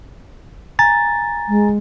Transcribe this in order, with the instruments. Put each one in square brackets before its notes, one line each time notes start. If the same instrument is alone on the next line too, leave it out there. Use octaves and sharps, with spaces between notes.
[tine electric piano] G#5 A#5 A6
[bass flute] G#3